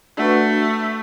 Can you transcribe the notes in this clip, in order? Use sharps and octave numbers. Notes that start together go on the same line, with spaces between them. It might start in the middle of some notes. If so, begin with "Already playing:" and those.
A3 D4 F#4 B4